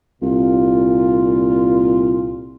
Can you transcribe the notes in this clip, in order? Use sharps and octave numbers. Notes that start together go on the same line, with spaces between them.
C2 A#2 F4